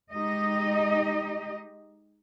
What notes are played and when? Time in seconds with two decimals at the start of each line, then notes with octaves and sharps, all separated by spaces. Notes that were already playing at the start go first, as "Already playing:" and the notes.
0.11 G#3 D#4 G4 D#5